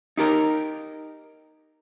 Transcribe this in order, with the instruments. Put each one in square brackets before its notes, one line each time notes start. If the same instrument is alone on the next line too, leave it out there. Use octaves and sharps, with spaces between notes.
[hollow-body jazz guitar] D#4 G4 A#4